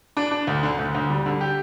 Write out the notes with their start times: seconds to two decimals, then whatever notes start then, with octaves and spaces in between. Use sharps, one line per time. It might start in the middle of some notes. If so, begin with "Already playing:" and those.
0.17 D4
0.31 D4
0.47 D2
0.63 D3
0.79 D2
0.95 D2
1.10 G3
1.26 D3
1.41 G4